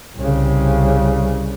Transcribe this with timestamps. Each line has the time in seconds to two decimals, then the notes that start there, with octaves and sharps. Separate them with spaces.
0.18 C2 C#3